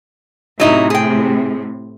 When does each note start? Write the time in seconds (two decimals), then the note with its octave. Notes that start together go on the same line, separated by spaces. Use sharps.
0.60 A2 C3 F#3 D#4 E4
0.90 G#4 G5